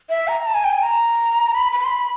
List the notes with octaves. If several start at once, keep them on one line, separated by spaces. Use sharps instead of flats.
E5
A#5
A5
G#5
G5
G#5
A#5
B5
B5
C6
B5